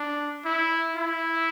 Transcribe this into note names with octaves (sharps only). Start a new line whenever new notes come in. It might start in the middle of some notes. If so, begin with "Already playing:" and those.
Already playing: D4
E4
E4